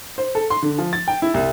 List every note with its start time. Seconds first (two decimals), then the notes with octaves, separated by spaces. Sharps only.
0.18 C5
0.35 A4
0.50 C6
0.62 D3
0.78 F3
0.93 A6
1.08 G5
1.22 E4
1.34 C2